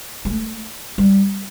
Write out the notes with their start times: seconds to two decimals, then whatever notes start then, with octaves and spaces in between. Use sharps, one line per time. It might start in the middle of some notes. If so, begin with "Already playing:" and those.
0.25 G3
0.30 A3
0.98 G3